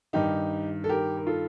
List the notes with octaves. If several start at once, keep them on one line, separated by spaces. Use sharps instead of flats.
G2 D#3 D#4 G4
A4
G4 A#4
A#4
F4 A4